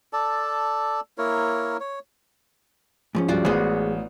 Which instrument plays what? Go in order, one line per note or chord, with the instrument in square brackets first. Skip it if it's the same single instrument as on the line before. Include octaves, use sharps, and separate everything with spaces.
[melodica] A4 D5 A5
A#3 E4 A#4 C#5
C#5
[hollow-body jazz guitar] G#2 F3 C#4
[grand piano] C#2 G2 [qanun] F4 F#4 D5
[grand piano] A1 [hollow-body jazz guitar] G#3 G#4 C5 [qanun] B3 F#4